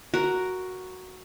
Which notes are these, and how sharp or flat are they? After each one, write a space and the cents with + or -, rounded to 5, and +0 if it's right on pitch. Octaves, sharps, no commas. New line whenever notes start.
F#4 +0 A#4 +0